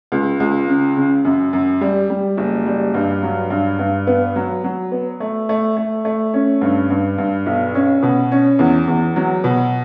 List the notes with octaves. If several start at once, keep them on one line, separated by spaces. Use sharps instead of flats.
C#2
C#2
C#3
C#3
F#2
F#2
G3
G3
F#1
G3
G2
F#3
G2
G2
B3
F#3
F#3
B3
A3
A3
A3
A3
C#4
G2
G2
G2
B1
C#4
B2
C#4
E2
E2
F#3
B2